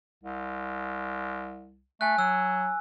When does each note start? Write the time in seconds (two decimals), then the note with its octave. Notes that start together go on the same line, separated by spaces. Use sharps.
0.24 C2
2.01 A3 G#5 F#6
2.18 F#3 E6